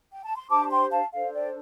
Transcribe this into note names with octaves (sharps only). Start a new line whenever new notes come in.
G5
A5
C6
D4 G4 C5 A5 D6
A5
G5 C6
F5 A5
D4 A4 C5 F5
D5 G5